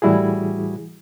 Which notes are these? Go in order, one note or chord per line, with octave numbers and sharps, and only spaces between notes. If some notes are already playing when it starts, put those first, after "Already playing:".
A2 E3 G3 E4 F#4 G#4